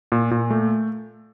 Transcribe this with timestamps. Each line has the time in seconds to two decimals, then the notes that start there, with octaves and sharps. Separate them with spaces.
0.12 A#2
0.31 A#2
0.50 A3